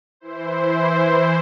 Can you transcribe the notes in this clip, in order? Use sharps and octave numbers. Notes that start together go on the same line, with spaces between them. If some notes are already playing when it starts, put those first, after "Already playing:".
E3 E4 C5